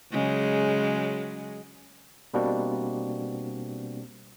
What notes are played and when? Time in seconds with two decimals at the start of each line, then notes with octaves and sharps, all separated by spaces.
0.12 C#3 F#3 G#3
2.34 B2 G3 A#3 C4 D4 F#4